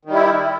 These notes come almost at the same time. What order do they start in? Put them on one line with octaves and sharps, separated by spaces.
D#3 G3 E4